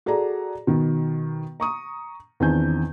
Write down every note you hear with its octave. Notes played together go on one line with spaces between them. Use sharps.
F#4 G#4 A4 D5 A#5
B2 D#3
A#5 C#6 D#6
E2 D#3 C4 D4 G#5 G6